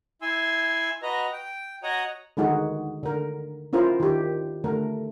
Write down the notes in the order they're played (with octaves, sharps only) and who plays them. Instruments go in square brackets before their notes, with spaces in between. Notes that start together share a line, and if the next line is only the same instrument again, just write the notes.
[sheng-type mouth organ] E4 G#5 C6 E6
F#4 B4 D#5 A#5
G5
F#4 C#5 D#5 F#5 A#5 D#6
[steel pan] D3 D#3 G#3 D#4 F#4 G#4
D3 A#4
C#4 E4 F4 A#4 C5
D#3 G4
D3 A3 A#4